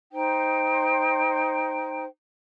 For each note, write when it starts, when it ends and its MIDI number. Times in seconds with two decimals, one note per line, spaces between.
0.11 2.04 63
0.11 2.04 72
0.11 2.04 79